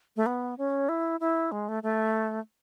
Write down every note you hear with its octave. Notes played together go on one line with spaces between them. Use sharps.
A3
B3
C#4
E4
E4
G#3
A3
A3